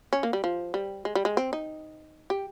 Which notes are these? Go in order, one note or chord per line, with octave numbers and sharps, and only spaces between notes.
C#4
A#3
G3
F3
G3
G#3
G3
G#3
C4
D#4
G4